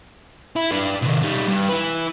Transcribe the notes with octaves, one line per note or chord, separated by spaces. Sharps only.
E4
D4 B4
C3 D#3
G3 D#4
G2
E4 B4